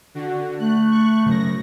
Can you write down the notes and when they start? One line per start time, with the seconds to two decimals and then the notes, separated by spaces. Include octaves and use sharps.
0.14 D3 F#4
0.60 A3 F#6
0.91 C#6 F#6
1.26 F#2 C#3 F#3 A#6